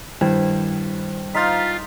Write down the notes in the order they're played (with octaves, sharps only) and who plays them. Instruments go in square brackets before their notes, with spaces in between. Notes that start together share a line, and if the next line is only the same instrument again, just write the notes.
[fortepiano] G2 [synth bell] D#3 E4 C5
[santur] D#4 C5 F5 [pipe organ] F4 [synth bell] A6 B6